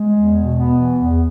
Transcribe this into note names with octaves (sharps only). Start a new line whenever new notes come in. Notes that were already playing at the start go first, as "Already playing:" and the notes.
Already playing: G#3
E2
B2
B3
E3
E2